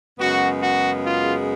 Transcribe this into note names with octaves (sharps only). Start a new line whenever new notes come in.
F#2 C#3 G#3 B3 F#4
F#4
F4